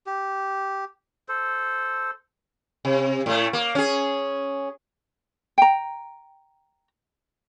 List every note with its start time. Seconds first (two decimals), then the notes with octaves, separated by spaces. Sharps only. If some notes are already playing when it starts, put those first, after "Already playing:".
0.07 G4
1.28 A4 C5
2.85 C3
3.26 A2 A3
3.53 A#3
3.75 C#4 G#4
5.58 G5 A#5